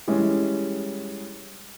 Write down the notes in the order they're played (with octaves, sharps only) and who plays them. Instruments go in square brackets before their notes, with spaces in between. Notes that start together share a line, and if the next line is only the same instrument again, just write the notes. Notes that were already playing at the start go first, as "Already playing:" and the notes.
[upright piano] E3 G3 G#3 C#4